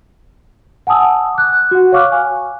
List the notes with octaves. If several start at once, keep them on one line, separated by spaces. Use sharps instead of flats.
F#5 G#5 A5 D#6 E6
D6 F#6
F#4 F#5
C#5 F5 C#6 D6 F6 F#6
G#5